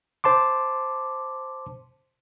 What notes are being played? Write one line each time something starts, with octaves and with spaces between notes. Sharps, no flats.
C5 A5 C6 D6